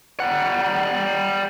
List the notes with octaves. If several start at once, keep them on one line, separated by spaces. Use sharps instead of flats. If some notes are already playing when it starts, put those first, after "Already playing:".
G3 F#5